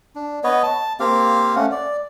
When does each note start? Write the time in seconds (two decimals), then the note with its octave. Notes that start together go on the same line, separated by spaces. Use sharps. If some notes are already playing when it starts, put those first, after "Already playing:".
0.15 D4
0.44 B3 B4 C#5 D#5
0.63 A5
1.00 A#3 C4 G4 F5
1.56 A3 C#4 F#5
1.71 D5